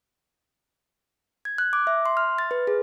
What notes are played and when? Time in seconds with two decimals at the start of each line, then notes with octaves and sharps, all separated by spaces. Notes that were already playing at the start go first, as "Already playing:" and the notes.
1.45 G#6
1.58 F#6
1.73 D6
1.87 E5
2.06 C6
2.17 F6
2.39 A6
2.51 B4
2.67 G#4